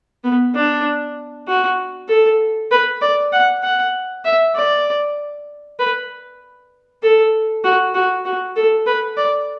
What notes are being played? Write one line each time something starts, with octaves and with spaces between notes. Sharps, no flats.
B3
D4
F#4
A4
B4
D5
F#5
F#5
E5
D5
B4
A4
F#4
F#4
F#4
A4
B4
D5